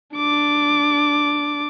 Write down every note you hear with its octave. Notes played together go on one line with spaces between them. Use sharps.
D4 D6